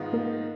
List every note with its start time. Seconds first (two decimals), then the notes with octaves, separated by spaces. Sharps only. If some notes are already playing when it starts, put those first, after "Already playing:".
Already playing: G#2 D#3 G#3 B3 F4
0.13 A#3 A#4